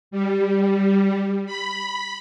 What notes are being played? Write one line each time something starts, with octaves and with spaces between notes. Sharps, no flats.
G3
B5